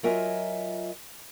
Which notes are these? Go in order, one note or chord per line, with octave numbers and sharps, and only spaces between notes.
F#3 F4 A#4 D#5 E5 G#5